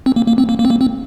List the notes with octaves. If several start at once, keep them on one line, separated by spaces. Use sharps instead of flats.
C4
A#3
A#3
C4
A#3
A#3
C4
A#3
C4